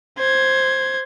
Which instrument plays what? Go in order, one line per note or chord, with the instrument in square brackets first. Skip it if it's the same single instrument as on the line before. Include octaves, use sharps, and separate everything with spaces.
[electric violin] C5 G#6